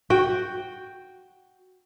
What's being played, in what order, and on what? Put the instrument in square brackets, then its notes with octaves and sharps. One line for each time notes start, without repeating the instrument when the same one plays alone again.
[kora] F#4 G5